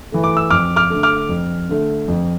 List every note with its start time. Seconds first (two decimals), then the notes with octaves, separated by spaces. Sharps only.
0.12 E3 A3
0.24 D6
0.37 E6
0.50 F2 D6 F6
0.76 D6 F6
0.90 D3 A3
1.03 D6 F6
1.29 F2
1.69 D3 A3
2.08 F2